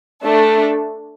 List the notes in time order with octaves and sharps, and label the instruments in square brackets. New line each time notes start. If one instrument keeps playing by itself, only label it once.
[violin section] A3 D4 A4